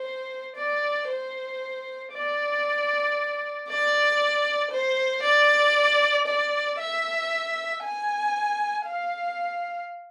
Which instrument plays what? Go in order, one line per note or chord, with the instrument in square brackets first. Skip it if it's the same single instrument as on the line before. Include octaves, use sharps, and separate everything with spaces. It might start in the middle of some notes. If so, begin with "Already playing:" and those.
Already playing: [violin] C5
D5
C5
D5
D5
C5
D5
D5
E5
G#5
F5